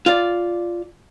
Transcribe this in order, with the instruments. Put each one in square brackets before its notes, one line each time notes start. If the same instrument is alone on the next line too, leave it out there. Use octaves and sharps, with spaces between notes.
[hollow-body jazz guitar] F4 D5